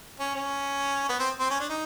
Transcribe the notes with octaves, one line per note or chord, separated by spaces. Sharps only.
C#4
C#4
B3
C4
C4
C#4
D4
D#4